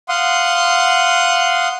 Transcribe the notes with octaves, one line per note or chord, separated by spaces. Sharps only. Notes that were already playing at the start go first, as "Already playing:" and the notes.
F5 F#5 C6 D#6